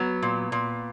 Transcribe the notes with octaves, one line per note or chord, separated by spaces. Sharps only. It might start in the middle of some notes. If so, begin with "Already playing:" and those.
Already playing: F#3 B3
A#2
A#2